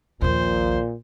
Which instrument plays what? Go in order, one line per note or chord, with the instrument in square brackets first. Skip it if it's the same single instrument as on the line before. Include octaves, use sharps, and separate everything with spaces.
[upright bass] A#1 D#2 [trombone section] A#2 [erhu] C5